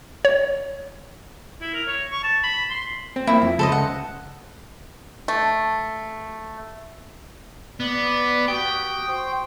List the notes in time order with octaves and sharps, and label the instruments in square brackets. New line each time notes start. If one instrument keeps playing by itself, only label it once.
[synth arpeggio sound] C#5
[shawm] E4
A#4
C#5
C#6
A5
B5
C6
[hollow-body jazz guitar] C4
[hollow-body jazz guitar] A#3 C4 [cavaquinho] E4
[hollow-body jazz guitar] F2
[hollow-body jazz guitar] C#2 [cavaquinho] A4 C5 D#5
[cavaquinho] F#5
[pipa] A3
[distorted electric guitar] B3 [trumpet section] B4 D5
[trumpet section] F#4 G4 D#6 [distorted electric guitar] G5
[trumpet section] C5 C6 C#6